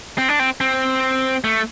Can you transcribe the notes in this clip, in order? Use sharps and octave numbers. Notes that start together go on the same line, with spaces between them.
C4
D4
C4
C4
A3